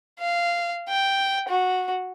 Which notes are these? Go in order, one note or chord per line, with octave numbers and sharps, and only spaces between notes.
F5
G5
F#4